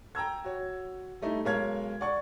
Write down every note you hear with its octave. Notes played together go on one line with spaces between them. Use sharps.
G5 A#5 E6 G#6
F#4 C#5
G3 A3 D#4 E4
B1 G#3 A#4 C#5 F5 G#6
D5 F#5 C#6